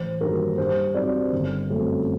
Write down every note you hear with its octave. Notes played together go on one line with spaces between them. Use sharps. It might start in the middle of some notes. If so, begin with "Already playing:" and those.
Already playing: A1 C5
G2 D#3 F#3 A#3 A#4
G2 C5
F#3 C4 D#4 D5
G1
F#2 F#3 A3 C4